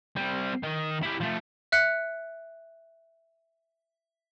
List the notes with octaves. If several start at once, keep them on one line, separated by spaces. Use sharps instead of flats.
G3 C4
D#3
E4 G4
F3 A3
E5 F#6 C#7